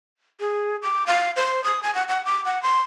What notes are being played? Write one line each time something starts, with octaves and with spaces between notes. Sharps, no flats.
G#4
D6
F5
C5
D#6
G#5
F#5
F#5
D6
F#5
C6